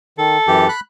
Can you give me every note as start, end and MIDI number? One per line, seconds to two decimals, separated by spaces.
0.18 0.37 51
0.18 0.69 69
0.48 0.67 42
0.48 0.67 52
0.48 0.67 67
0.69 0.80 83
0.69 0.80 90